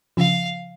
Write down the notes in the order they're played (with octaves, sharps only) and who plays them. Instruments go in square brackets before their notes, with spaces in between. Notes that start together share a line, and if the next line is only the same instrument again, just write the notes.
[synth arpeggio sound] C#3 F3 [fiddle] F5